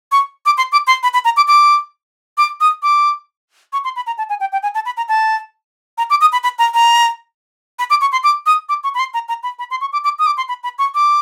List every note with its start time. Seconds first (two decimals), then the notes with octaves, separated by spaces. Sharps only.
0.12 C#6
0.46 D6
0.57 C6
0.72 D6
0.87 C6
1.03 B5
1.14 B5
1.25 A#5
1.37 D6
1.48 D6
2.38 D6
2.61 D#6
2.83 D6
3.73 C#6
3.84 C6
3.96 B5
4.07 A#5
4.18 A5
4.29 G#5
4.40 G5
4.52 G5
4.63 G#5
4.75 A5
4.85 B5
4.97 A#5
5.09 A5
5.98 A#5
6.10 D6
6.21 D#6
6.32 B5
6.43 B5
6.59 A#5
6.74 A#5
7.79 B5
7.90 D6
8.01 C#6
8.12 C6
8.24 D6
8.46 D#6
8.69 D6
8.84 C#6
8.94 B5
8.99 C6
9.14 A#5
9.29 A#5
9.43 B5
9.59 B5
9.71 C6
9.81 C#6
9.93 D6
10.04 D6
10.19 D#6
10.26 D6
10.37 C6
10.49 B5
10.64 B5
10.79 C#6
10.95 D6